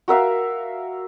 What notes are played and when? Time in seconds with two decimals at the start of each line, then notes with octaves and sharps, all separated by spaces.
0.08 F#4 A#4 E5 F5